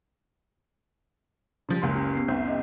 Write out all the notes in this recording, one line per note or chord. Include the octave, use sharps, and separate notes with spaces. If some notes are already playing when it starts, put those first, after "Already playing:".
C#3 F3 G3
F#1 C#2 C6
C#4 G4
B3 C7
F1 C2 C4 G6
B3 C#4 D#5